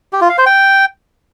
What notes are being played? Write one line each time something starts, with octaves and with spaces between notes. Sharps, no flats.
G4
F4
F5
C5
G5